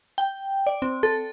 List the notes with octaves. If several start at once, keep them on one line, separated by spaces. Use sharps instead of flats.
G5
D5
C4
A4